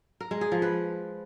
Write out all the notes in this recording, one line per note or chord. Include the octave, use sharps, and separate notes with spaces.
A#4
G#3
G#4
F3
B4